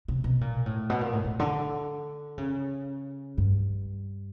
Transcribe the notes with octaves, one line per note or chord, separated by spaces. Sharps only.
C3
B2
A#2
A2
B2
A#2
A2
A#2
D3
C#3
G2